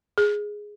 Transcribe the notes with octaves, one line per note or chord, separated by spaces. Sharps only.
G#4